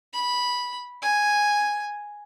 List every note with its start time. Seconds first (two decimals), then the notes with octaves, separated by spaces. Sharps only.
0.13 B5
1.02 G#5